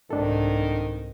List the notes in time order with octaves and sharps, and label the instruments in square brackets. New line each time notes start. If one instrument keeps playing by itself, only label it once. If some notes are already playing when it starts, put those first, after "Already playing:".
[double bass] C2 [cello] G#2 [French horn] D#3 [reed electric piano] D4 A4